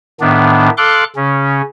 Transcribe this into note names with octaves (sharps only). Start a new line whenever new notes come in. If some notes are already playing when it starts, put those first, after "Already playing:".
A2 D#3 B3 D4
A4 F5 C6 D6 F#6
C#3 C#4